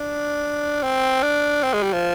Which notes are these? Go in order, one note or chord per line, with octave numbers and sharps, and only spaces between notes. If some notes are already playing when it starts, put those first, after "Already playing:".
Already playing: D4
C4
D4
C4
G#3
G3
F3